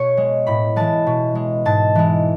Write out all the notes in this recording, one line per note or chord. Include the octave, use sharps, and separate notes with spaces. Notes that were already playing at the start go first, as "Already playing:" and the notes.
Already playing: B2 C#5
G#3
A2 B5
E3 G#3 A5
B2
G#3
G#2 A5
E3 G#3